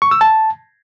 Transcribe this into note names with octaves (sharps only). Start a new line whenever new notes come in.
C#6
E6
A5